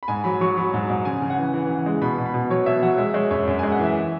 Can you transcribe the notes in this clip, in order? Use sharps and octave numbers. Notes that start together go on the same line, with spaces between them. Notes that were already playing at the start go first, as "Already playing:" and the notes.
B5
G#2 G#5
F#3 B5
F#3 C#6
F#3 B5
G#2
G#2
C#3 G#5
C#3
F#5
E3
E3
C#3
G#3
B2 B5
B2
B5
B2
F#3 C#5
B2 E5
F#3 F#5
G#3 E5
G#3 C#5
F#2 C#5
F#2
G#3 G#5
F#5
E3 E5